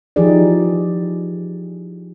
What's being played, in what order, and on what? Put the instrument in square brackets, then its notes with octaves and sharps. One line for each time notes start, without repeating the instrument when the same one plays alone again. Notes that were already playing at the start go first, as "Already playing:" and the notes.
[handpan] E3 F3 D#4 G4 G#4 D5